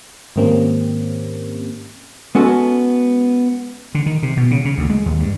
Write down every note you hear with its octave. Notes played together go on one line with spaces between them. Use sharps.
G#2 D#3 A#3 C4 C#4 G4
G#3 B3 C#4 F#4 A4
D3
D#3
C3
B2
C#3
C#3
D2
G#3
D#2
G2